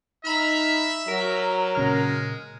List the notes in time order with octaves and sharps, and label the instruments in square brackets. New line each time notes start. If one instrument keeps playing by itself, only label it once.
[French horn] D#4 [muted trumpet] E5 [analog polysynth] A#5 B5 F6
[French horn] F#3 [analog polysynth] A#4
[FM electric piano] A#2 C#3 F6 [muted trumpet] G#3